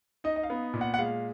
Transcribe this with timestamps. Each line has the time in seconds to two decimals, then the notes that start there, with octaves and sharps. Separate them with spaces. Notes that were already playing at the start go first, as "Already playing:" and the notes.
0.24 D#4 D#5
0.36 D#5
0.43 F5
0.50 B3
0.74 A#2
0.81 F#5
0.94 F#5
0.99 G#3 F5